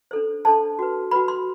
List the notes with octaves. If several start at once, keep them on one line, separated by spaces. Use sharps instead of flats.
D4 A4 C5
D4 A4 C5 A5
F#4 B4
F#4 B4 B5
C6